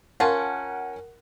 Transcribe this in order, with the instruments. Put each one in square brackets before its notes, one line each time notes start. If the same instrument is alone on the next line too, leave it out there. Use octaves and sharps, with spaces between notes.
[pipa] C#4 F4 A5 [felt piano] A#4 F#5